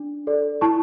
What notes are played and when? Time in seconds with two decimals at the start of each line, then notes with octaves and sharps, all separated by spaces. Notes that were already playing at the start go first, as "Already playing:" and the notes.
Already playing: D4
0.27 A4 D5
0.61 E4 A5 C#6